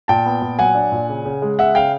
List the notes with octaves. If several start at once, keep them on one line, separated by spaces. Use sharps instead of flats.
A#2 G5 A5
B3
A#2
F#3 F#5 G#5
D4
A#2
C#3
C#3
G#3
C#3 E5 F#5
C#3 F5 G5